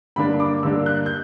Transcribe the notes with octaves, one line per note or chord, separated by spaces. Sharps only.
G2 D3 A#3 D4 B5
D6
G2 D3 A#3 D4 E6
F#6
G6